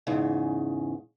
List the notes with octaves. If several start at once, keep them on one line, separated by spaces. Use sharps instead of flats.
E2 G#2 C#3